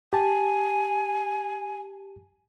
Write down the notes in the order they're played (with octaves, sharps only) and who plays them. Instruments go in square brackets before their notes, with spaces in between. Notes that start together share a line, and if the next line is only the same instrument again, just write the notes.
[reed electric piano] G4 A5 [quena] G#5